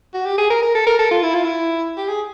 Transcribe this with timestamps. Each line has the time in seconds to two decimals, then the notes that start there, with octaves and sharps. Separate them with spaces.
0.14 F#4
0.26 G4
0.38 G#4
0.50 A#4
0.63 A#4
0.75 A4
0.87 A#4
0.99 A4
1.11 F4
1.23 E4
1.34 F4
1.45 E4
1.98 G4
2.09 G#4